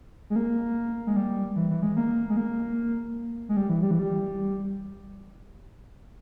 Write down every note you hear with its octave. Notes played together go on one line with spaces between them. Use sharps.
G#3
A#3
G#3
G3
E3
E3
G#3
A#3
G#3
A#3
G#3
G3
E3
G3
E3
G3